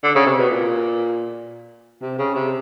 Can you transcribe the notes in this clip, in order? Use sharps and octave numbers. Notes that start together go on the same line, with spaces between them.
D3
C#3
C3
B2
A#2
C3
C#3
C3